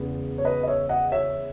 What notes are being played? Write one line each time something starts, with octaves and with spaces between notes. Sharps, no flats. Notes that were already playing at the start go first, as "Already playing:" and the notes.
Already playing: E2 C#3 G#3 B3
C#5
B4 D#5
D#5
C#5 E5
D#5 F#5
C#5 E5